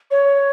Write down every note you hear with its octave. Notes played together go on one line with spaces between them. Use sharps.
C#5